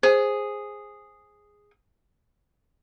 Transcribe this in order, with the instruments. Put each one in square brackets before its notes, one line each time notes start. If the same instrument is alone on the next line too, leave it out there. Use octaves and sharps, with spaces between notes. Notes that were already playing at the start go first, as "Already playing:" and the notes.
[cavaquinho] G#4 [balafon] C5